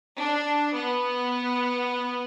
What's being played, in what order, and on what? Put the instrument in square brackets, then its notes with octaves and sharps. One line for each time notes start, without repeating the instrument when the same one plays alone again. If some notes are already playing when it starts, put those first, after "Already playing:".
[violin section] D4
B3